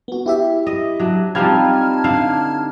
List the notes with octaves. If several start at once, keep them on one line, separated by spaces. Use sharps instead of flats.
B3 F#4
E4 G4 E5
D#5
F#3 D4
F3 G3 C4 D#4 F4 A5 F6 G#6
D3 E4 F5